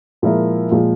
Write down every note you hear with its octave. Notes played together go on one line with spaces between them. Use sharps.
A#2 F3 G#3 E4 A#4
A#2 F3 G#3